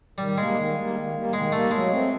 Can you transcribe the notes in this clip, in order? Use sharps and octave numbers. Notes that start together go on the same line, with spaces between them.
D#3 G3
G3 G#3 A#3
D#3
G3 A#3
D#3
G3 A#3
D#3 G#3
G3 A3 A#3
F#3 G#3
A3 C4